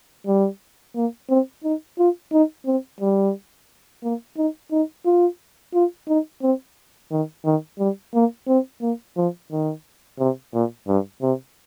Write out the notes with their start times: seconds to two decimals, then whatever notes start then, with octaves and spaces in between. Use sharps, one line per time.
0.27 G3
0.96 A#3
1.29 C4
1.64 D#4
1.99 F4
2.32 D#4
2.66 C4
3.01 G3
4.04 A#3
4.38 D#4
4.72 D#4
5.06 F4
5.75 F4
6.08 D#4
6.42 C4
7.12 D#3
7.45 D#3
7.79 G3
8.14 A#3
8.48 C4
8.82 A#3
9.17 F3
9.51 D#3
10.19 C3
10.54 A#2
10.88 G2
11.22 C3